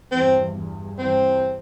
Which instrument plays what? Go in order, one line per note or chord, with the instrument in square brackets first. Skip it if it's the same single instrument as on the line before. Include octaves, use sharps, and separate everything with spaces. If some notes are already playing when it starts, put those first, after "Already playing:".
[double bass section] E2 G2 [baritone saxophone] C4
[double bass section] E2 G2
[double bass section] E2 G2 [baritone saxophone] C4